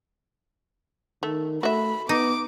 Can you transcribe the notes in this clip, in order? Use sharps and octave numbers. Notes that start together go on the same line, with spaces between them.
D#3 A3
A3 F#4 E5 B5
B3 D#4 D6